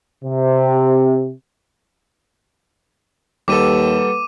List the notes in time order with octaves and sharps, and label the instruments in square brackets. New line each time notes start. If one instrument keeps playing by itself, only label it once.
[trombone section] C3
[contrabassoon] D#2 [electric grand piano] G3 A4 [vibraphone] A#3 B4 F#5 [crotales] D6 D#7